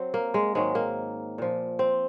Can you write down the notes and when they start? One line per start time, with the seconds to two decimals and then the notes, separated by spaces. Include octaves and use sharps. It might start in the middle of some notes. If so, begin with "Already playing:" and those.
Already playing: F#3 C4
0.14 A#3
0.34 G#3
0.55 G#2 D#3 F#3 G#3
0.75 A#3
1.38 A#2 F3
1.79 C4